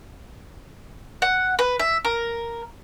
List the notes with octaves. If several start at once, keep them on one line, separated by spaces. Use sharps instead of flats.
F#5
B4
E5
A#4